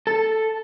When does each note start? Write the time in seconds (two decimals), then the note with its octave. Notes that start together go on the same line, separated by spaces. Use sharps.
0.07 A4